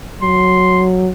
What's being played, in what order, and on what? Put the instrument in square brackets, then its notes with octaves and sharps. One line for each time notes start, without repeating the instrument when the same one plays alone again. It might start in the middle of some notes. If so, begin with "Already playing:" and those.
[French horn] F#3 [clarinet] C6